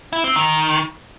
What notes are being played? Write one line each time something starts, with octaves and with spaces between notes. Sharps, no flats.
E4
C4
D#3